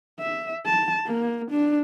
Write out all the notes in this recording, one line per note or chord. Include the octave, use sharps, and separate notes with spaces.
E5
A5
A#3
D4